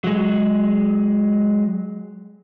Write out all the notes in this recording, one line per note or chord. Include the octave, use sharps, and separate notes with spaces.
F#3 G#3